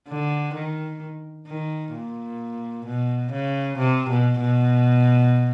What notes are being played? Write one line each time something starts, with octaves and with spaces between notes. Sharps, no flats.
D3
D#3
D#3
A#2
B2
C#3
C3
B2
B2